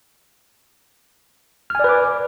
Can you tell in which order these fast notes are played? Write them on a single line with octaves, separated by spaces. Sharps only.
F6 G#5 D5 B4 D6